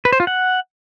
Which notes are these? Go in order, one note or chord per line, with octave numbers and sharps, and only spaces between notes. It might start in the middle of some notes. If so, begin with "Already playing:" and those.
B4
C5
F4
F#5